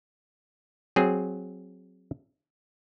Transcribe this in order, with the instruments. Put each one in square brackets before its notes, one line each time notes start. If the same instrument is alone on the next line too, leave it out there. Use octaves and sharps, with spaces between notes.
[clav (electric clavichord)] F#3 C4 G#4